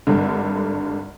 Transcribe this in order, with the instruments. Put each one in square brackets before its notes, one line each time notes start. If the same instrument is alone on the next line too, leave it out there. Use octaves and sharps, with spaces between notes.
[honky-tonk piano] G#1 G2 D3